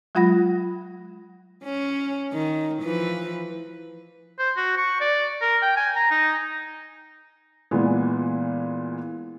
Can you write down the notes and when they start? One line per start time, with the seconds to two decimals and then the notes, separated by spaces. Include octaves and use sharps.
0.15 F#3 G#3 F4 F#5 B5 A#6
1.63 C#4
2.33 D#3
2.82 E3 F3 B4
4.39 C5
4.57 F#4
4.77 C#6
5.01 D5
5.41 A#4
5.62 G5
5.76 G#5
5.96 A#5
6.11 D#4
7.71 A#2 E3 G#3 B3